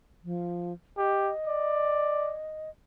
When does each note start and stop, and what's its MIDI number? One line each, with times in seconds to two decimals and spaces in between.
0.24 0.73 53
0.98 1.32 67
0.98 2.70 75
1.47 2.35 74